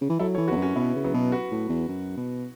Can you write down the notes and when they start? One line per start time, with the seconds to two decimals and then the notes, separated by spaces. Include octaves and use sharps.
0.01 C#3
0.10 E3
0.19 F#3 E4 A4
0.34 A4 C#5
0.38 E3
0.48 F#4 B4
0.52 E2
0.57 F#2
0.62 C#4 F#4
0.76 B2 B3 E4
0.95 C#3
1.04 F#3 B3
1.14 B2
1.32 F#4 B4
1.52 A2
1.69 E2
1.89 F#2
2.17 B2